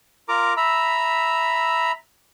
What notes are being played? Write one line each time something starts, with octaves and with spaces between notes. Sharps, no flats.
F4 A#4 A#5 D6
E5 A#5 B5 E6